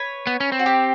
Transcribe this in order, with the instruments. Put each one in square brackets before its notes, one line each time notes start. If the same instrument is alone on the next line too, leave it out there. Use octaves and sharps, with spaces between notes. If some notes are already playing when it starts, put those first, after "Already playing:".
Already playing: [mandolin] B4 C#5
[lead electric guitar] B3
C#4
C4
[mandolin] F#4
G4